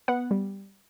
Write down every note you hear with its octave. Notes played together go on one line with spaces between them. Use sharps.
B3 F#5
G3